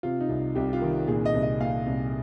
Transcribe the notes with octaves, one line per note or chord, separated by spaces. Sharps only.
C3 F4
D#4
C2
C2 G4
F4
D#3
A#2 G#4
D#5
C2
D#5
A#2 F5
C2